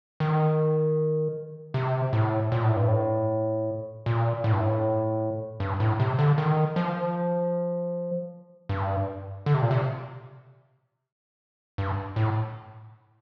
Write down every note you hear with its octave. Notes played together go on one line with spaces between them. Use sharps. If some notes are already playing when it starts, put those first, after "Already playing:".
D#3
C3
A2
A#2
A2
G2
A2
A#2
A2
G2
A2
G2
A2
C3
D3
D#3
F3
G2
D3
C3
A#2
C3
G2
A2